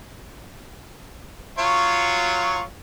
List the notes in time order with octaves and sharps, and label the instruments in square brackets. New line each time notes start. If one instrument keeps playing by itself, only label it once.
[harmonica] F#3 F4 C#5